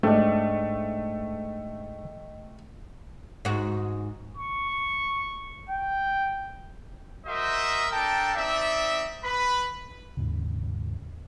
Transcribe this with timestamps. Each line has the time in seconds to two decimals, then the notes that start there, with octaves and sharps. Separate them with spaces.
0.03 G#2 A3 D4 D#5 G5
3.45 G#2 F#4
4.37 C#6
5.70 G5
7.26 F#4 A#4 C5 D#5 E5
7.91 D4 A4 A#4 G5 A5
8.35 C4 D#4 D5 E5
9.23 B4 B5
10.17 D#2 G#2 C#3